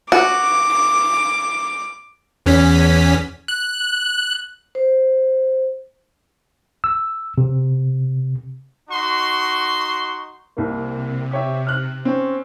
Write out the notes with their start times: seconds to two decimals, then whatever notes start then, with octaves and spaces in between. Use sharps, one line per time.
0.12 F#4 D6
2.46 E2 C#4 B6
3.48 F#6
4.75 C5
6.84 E6
7.38 C3
8.89 D#4 F#4 C6 C#6
10.57 C2 C3 A#3
11.31 G4 C#5 E5
11.67 F6 F#6
12.05 C4 C#4